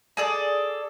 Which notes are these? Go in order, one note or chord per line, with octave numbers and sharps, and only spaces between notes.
G#4 A4 D5